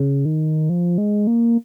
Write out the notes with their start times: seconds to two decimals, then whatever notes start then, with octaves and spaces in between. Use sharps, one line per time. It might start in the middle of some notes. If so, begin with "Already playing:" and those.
Already playing: C#3
0.25 D#3
0.69 F3
0.98 G#3
1.27 A#3